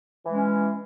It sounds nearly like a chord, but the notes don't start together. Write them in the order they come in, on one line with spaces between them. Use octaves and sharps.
E3 G#3 C#4